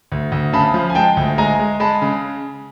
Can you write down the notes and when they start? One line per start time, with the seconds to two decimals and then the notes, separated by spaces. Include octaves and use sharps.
0.12 D2
0.32 D2
0.53 C#3 A5 B5
0.74 F3
0.90 G#5
0.95 G#3 G5 A5
1.17 D2
1.38 G#3 G#5 A#5
1.59 G#3
1.80 G#3 A5 B5
2.02 C#3